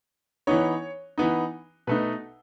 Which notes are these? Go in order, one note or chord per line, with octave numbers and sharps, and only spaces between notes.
E3 B3 D#4 C#5
E3 B3 D#4
B2 A3 D#4 B4